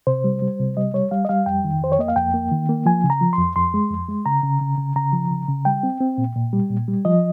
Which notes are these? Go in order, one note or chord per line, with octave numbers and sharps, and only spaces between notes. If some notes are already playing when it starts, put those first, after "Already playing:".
C3 C5
G3
G3
C3
G3 D#5
G3 C#5
G3 F5
D#5
G3 F5
F2 G5
D#3
F2 C5
C#5
A#3 D#5
F5
F2 G5
A#3
D#3
A#3
F3 G#5
C#3
A#5
F3
C6
F2
F2 C6
G#3
F2
G#3
C#3 A#5
C#3
C#3
C#3
C#3 A#5
F3
C#3
C#3
G3 G5
C4
C4
A#2
A#2
G3
A#2
G3
F3 D#5